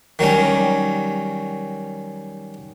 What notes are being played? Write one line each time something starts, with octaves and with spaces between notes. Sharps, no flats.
D#3 F#3 G3 C#4